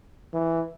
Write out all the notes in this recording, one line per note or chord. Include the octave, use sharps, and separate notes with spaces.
E3